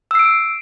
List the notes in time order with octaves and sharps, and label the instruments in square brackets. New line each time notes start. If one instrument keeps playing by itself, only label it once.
[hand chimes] E6
C7
D7